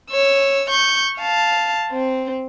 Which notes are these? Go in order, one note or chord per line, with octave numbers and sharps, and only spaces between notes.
C#5 E6
C#6 G6
F5 A5
C4